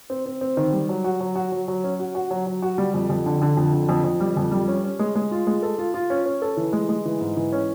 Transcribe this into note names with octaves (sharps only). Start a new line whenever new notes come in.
C4
C4
C4
D#3
G3
F#3
F#4
F#3
F#4
F#3
F#3
C#4
F#4
F#4
F#3
F#3
F#4
G3
F2
F2
D3
D3
F2
D3
F2
F2
G3
F2
G3
C#4
C#4
G#3
G#3
F4
G#3
A4
F4
F4
C#4
C#4
A4
E3
G#3
G#3
E3
G#2
E3
C#4